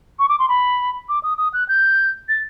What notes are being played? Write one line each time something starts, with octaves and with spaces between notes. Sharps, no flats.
C#6
D6
C6
B5
D6
D#6
D#6
F#6
G6
A6